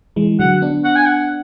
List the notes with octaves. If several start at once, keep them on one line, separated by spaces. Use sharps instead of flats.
E3 G#3
D3 F#3 F#5
B3 D4
F#5
G#5
F#5